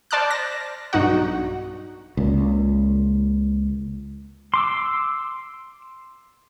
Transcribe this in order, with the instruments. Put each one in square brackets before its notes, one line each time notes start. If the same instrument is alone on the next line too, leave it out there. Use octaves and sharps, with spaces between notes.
[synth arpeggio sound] C5 D5 A5 D6 F6 F#6
A#6
B1 G2 D#4 F#4 F#5
[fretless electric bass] C#2 A#2
[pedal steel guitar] C6 D6 E6